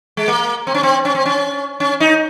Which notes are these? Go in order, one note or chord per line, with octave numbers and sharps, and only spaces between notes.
G#3
A#3
C4
C#4
C4
C#4
C4
C#4
C#4
D#4